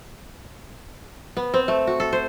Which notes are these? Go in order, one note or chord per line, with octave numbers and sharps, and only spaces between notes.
B3
C4
A3
F#4
A4
C5